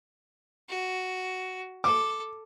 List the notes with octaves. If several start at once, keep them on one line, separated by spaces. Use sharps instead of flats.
F#4
A4 D6